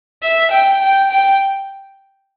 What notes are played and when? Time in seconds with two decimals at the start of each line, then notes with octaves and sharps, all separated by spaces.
0.23 E5
0.51 G5
0.82 G5
1.11 G5